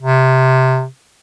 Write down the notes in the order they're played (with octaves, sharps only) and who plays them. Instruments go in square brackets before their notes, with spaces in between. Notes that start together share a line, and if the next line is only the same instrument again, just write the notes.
[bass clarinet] C3